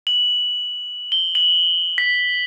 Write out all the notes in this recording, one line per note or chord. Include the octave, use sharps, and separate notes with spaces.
F#7
G7
F#7
B6